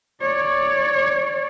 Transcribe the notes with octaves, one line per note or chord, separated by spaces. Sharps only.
C#5 D5